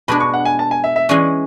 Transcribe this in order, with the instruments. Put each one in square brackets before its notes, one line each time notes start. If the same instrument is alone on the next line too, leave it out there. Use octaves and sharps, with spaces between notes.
[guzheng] B2 G#3 D4 [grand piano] B5
[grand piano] C#6
F#5
G#5
A5
G#5
E5
E5
[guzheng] E3 G#3 C#4 G#4 [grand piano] D5